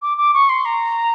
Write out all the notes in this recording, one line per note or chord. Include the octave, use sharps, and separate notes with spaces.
D6
D6
C#6
C6
A#5